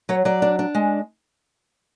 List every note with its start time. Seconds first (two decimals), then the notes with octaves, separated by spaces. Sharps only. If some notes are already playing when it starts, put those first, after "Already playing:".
0.09 F#3 C#5
0.25 F#3 D5
0.42 D4
0.59 D4
0.75 G#3